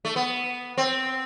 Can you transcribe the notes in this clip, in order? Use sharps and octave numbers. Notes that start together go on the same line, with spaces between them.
A3
B3
C4